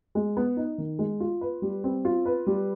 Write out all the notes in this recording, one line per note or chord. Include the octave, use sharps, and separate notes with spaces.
G#3
B3
D#4
D#3
G#3
F4
B4
G3
C4
F4
B4
G3